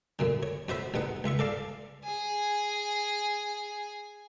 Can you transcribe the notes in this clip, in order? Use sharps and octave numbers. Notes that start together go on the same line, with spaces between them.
F#2 A#2 D3
C#5
F2 F#4 C5 E5 B5
A1 E2 D#4 F#5
C#2 F4 E5 C#6
A4 D5 F5 A5
G#4 G#5